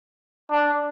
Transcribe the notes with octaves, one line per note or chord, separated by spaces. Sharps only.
D4